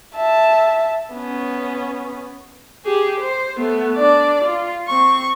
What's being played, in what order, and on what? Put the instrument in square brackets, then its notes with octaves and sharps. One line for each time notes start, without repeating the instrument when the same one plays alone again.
[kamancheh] E5 A5
B3 C#4
[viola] G4 G#4
C5
A3 B3
D4 D5
F4
C4 C#6